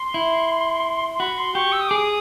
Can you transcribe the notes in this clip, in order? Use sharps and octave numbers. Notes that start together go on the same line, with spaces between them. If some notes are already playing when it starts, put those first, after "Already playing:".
Already playing: C6
E4
C6
F#4 B5
C6
G4 C#6
E6
D#6
G#4 D6
D#6